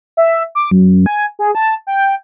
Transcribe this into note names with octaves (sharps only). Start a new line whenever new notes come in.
E5
D6
F#2
G#5
G#4
A5
G5